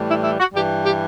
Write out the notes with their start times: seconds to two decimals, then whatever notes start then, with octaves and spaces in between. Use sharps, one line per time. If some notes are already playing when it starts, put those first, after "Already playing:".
Already playing: A2 E3 G3
0.09 E4
0.24 E4
0.40 F#4
0.54 G2 E3 G3 G4
0.85 G4